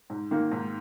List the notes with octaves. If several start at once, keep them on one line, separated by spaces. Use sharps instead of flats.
G#2
D#3 A#3
G#2